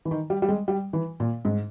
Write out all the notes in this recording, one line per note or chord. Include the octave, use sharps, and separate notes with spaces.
E3
D#3
G3
G3
G#3
G3
E3
A#2
G#2